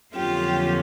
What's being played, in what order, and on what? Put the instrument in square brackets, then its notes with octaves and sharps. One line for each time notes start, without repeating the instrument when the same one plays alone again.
[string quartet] F2 D3 F#3 A#3 C#4 F4 G4